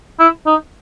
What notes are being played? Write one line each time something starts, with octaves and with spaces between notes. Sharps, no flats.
E4
D#4